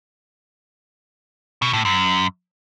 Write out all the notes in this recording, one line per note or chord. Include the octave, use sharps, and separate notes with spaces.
B2
A2
F#2